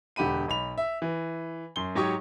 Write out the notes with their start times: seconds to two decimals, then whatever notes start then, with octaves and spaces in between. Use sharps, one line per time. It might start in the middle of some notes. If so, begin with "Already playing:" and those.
0.16 E1 D3 G4 F#5 B5 D#7
0.48 B1 B5 F7
0.78 E5
1.02 E3
1.76 F#2 C6 G7
1.95 G#2 F#3 G4 C#5 C#6 D#6